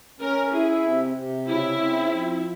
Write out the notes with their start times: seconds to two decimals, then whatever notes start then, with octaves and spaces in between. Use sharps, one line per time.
0.20 C#4 A#4
0.52 E4 G#4
0.84 C3
1.16 C3
1.48 C#3 E4
1.80 C4
2.13 F3